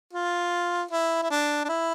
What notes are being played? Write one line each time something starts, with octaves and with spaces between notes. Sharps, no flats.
F4
E4
E4
D4
D4
E4